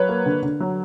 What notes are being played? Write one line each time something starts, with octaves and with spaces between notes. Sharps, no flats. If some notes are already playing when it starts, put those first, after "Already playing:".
Already playing: F#3 B4 C#5
A#3
D3
D3
F#3